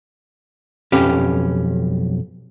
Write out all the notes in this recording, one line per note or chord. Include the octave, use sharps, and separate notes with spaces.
B1 F2 C#4 G4 B4